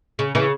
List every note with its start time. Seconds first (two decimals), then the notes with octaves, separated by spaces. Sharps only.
0.19 C#3
0.35 C#3 E3